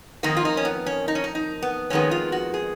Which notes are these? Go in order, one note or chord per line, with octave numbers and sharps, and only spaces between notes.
F2 D#3 A#3 D#4
F4
D#4
C#4
B3
C#4
D#4
C#4
D#4
D#4
B3
F2 D#3 G#3 B3 C#4
F4
F#4
G#4